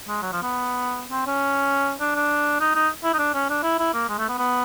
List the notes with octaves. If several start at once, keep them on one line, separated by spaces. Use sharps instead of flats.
G#3
F#3
F3
B3
C4
C#4
D4
D4
D#4
D#4
E4
D#4
D4
C#4
D4
E4
E4
A#3
G#3
A3
B3
B3